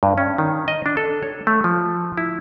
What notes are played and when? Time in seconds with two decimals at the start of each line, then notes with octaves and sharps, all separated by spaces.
0.03 G2
0.18 C#4
0.38 D#3
0.68 D#5
0.86 D4
0.97 A4
1.23 C#5
1.47 A3
1.64 F3
2.18 E4